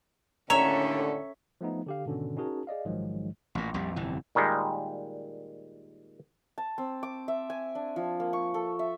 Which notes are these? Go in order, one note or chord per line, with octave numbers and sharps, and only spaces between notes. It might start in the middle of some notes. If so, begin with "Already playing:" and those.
D#2 A2 D3 C#4 A4 C#5 E5 A#5
F3 A3 B3 D#4
D3 G4 F5
G#2 B2 D3 D#3 C#4
C#4 D#4 F#4 G#4 A#4 A5
G#4 D5 D#5 F5
A#1 G#2 D#3 F3 F#3 G#3
A1 A#2
A#1 F2 G3
G1 F2 C3 E3
A#2 D#3 G3 G#3
A5
C4
D6
E5
G#5
D4
F3
A#3
C#6
A4
E5